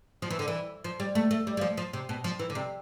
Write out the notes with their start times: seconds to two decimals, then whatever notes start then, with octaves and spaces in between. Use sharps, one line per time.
0.22 F3
0.30 E3
0.39 D3
0.48 E3
0.84 F3
1.00 G3
1.15 A3
1.31 A3
1.47 G3
1.57 G3
1.61 F3
1.77 F3
1.93 C3
2.09 B2
2.24 F3
2.39 E3
2.50 D3
2.55 C3